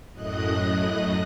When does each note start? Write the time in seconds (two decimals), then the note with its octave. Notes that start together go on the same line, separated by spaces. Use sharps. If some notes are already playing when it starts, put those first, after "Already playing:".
0.12 F#2 A2 D#5 D#6 F#6